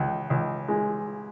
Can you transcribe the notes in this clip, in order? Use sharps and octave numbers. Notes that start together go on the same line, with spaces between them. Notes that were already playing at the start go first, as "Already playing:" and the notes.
Already playing: C#2
C#2
G#3